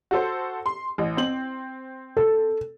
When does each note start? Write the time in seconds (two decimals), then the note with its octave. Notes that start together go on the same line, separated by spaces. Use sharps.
0.11 F#4 A4 C5
0.66 C6
0.98 A1
1.17 C4 F#7
2.17 A4